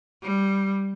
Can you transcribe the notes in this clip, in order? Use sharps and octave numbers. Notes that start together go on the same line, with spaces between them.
G3